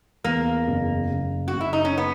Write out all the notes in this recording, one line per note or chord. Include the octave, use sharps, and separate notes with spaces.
E2 A#3
F#1
F#1
F#4
F#1
E4
D#4
C#4
B3